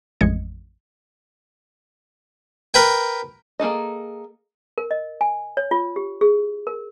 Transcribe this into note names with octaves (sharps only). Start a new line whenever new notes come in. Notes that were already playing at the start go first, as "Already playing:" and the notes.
A1 F2 G#3 D#5 G#6 C#7
A#4 B4 G5
A#3 G#4 A4 D#5
A#4
D#5
G#5
C#5
F4
G4
G#4
A#4